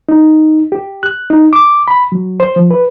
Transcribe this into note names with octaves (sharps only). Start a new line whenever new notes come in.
D#4
G4
F#6
D#4
D6
B5
F#3
C5
F3
B4